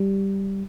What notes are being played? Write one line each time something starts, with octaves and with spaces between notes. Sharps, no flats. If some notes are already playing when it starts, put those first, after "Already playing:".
Already playing: G3